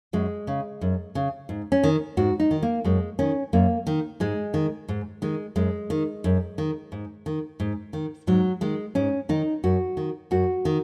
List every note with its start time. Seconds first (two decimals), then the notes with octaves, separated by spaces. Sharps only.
0.13 F#2 G#3
0.47 C#3
0.81 F#2
1.15 C#3
1.49 G#2
1.72 C#4
1.84 D#3
2.17 G#2 F#4
2.40 D#4
2.51 D#3
2.62 A#3
2.84 F#2 G#3
3.19 D#3 C#4
3.53 F#2 A#3
3.87 D#3
4.20 G#2 G#3
4.54 D#3
4.88 G#2
5.22 D#3 G#3
5.56 F#2 G#3
5.90 D#3
6.24 F#2
6.58 D#3
6.92 G#2
7.26 D#3
7.60 G#2
7.93 D#3
8.27 G#2 F#3
8.61 D#3 G#3
8.95 G#2 C#4
9.29 D#3 D#4
9.64 F#2 F#4
9.97 D#3
10.31 F#2 F#4
10.65 D#3